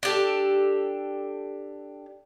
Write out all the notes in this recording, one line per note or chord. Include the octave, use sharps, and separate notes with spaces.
D4 G4 A4